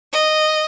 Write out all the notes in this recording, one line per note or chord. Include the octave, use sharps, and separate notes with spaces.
D#5